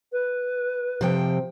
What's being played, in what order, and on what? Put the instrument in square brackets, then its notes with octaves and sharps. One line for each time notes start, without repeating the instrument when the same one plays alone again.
[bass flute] B4
[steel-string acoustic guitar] C3 F3 G5